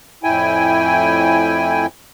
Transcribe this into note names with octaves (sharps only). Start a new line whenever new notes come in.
F2 A2 E4 G5 G#5